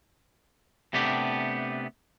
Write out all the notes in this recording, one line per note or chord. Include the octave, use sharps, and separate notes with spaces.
C3 A3 B3 D4 G4